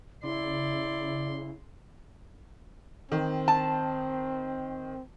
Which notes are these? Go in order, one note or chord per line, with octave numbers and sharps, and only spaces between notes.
C#3 E4 D5 C6
D#3 C4
A5